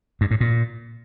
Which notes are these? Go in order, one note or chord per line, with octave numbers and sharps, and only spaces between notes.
G2
A2
A#2